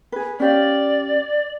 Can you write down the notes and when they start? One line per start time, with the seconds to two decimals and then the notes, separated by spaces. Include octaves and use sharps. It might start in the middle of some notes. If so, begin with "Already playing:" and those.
0.12 G#4 B4
0.40 C#4 G4 D5 F5